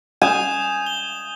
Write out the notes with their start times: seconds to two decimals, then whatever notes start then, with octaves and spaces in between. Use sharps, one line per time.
0.22 G#5 D#6 G6 E7
0.86 G7